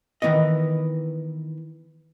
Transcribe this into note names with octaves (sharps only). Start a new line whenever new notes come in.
D#3 E3 B3 D#5